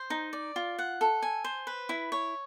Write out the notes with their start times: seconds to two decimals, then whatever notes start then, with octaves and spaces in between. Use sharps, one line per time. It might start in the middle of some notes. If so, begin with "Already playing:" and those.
Already playing: C5
0.10 D#4
0.33 D5
0.56 F4
0.79 F#5
1.01 A4
1.23 G#5
1.44 C5
1.67 B4
1.89 E4
2.12 C#5